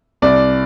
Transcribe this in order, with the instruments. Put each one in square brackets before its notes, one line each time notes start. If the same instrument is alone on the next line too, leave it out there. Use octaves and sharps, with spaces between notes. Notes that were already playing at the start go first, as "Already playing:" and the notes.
[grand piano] C2 D5